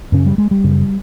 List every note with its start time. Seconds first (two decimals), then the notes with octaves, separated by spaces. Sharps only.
0.12 F#2 C#3 C#4
0.26 G3
0.38 G#3
0.51 G3
0.64 F#2 C#3